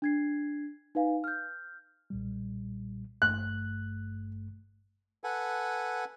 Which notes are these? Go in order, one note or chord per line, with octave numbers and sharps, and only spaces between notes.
D4 G#6 C7
D#4 B4 F5 G#5
F6 G6
B1 A#2 G3
G#1 G2 A3 F#6
A4 B4 F#5 G#5